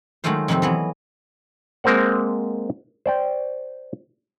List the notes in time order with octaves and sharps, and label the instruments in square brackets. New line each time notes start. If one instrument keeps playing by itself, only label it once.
[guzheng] D#3 F#3 G#3 A3 F4 C5
F2 C3 D#3 G3 C4 G4
E3 F#3 B3
[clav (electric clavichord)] G#3 A#3 C4 A#4 C5 F#5
C5 D5 G5